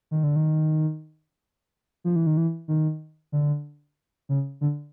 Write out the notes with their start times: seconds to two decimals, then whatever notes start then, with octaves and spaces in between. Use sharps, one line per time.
0.11 D#3
0.24 D3
0.36 D#3
2.04 F3
2.16 E3
2.27 D#3
2.37 E3
2.68 D#3
3.32 D3
4.29 C#3
4.61 D3